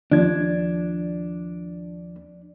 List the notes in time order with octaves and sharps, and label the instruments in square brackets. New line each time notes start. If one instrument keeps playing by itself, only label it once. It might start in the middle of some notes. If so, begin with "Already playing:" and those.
[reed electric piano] D#2 F3 G#6 [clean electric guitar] D4